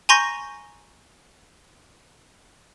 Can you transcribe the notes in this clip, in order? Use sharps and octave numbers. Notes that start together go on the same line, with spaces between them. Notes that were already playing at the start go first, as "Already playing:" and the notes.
G#5 A#5 C6 C#6 G6 A#6